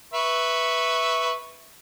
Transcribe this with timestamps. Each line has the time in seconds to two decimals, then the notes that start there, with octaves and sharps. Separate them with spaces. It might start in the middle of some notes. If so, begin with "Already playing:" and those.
0.13 B4 E5 C#6